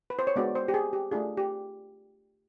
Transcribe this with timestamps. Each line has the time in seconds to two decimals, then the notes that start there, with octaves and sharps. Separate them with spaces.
0.10 B4
0.19 C5
0.27 C#5
0.36 G#3 B3 D4 F#4 D5
0.55 C5
0.68 G4
0.74 G#4
0.93 G4
1.11 A3 D4 F4 G#4
1.37 G4